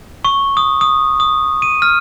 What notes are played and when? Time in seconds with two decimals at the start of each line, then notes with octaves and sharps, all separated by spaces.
0.25 C#6
0.57 D#6
0.81 D#6
1.20 D#6
1.62 D#7
1.82 F6